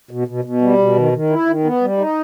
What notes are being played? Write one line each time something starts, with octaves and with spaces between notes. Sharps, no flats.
B2
B2
B2
G3
B2
D#3
D#3
E4
D#3
B3
G3
D#4